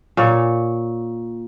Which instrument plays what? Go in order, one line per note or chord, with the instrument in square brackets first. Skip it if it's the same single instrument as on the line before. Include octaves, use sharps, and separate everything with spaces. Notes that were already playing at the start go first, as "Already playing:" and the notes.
[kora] A#2 C#5